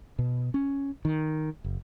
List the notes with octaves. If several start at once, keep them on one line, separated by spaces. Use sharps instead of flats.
B2
C#4
D#3
F#1